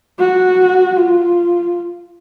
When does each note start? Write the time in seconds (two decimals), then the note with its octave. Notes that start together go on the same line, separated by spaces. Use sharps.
0.19 F#4
0.97 F4